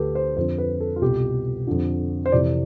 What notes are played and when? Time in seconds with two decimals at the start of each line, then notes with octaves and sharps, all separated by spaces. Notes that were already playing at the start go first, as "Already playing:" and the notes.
Already playing: D2 D3 G4 A4 B4
0.15 C5
0.37 F2 D3 C5
0.58 B4
0.81 A4
0.96 F4
1.01 C2 B2 G4
1.67 F2 D3
2.26 C5
2.32 F2 C3 E3 D5